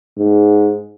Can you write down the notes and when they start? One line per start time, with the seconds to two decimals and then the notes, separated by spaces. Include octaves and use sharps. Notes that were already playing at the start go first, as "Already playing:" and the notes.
0.17 G#2